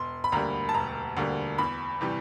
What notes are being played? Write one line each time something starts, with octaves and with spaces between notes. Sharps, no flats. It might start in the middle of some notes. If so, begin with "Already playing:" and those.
Already playing: E1 C6
B5
D2 D3 G3 A#3 A#5
A5
E1 A#5
D2 D3 G3 A#3
E2 B5
C3 E3 G3